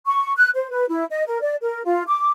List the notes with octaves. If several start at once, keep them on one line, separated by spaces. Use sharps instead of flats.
C#6
F#6
C5
B4
E4
D#5
A#4
D5
A#4
F4
D6